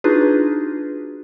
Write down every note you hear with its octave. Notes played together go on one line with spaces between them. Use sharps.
D4 D#4 F4 F#4 G#4 B4